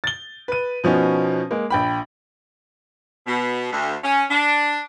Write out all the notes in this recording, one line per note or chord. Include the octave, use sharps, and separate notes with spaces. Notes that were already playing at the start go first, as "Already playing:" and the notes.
A6 G7
B4 D#7
B2 F3 B3 C#4 D#4
G#3 A#3
A#1 G5 B5
B2
D2
C#4
D4